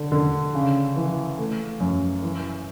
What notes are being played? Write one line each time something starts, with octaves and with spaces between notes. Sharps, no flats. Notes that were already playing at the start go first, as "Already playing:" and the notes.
Already playing: D3
D3
C#3
E3
A3
F#2
E3